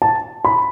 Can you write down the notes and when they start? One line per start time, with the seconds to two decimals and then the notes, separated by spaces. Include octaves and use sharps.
0.02 A5
0.45 B5